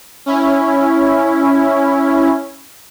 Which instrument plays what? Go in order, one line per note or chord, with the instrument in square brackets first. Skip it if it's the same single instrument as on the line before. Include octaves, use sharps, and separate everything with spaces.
[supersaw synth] C#4 E4